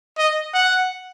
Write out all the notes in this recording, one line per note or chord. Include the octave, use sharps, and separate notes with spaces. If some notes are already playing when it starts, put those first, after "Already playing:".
D#5
F#5